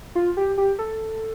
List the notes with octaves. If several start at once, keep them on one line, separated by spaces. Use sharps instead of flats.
F4
G4
G4
A4